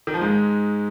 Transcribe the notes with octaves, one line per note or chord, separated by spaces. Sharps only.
D#3
F3
G#2 G#3